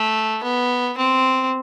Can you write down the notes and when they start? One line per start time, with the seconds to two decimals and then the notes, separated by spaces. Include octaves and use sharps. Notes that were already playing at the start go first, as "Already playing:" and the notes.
Already playing: A3
0.43 B3
0.98 C4